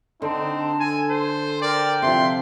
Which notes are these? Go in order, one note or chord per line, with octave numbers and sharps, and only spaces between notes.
D3 C4 D#4 A5
A4 G#5
C5
A#4 D5 G5
C3 F3 E5 C6